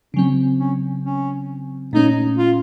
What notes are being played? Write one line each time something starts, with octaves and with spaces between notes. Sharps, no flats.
C#3 F#3 C4 C#4
C#4
C#4
A#2 A3 C#4 D#4
F4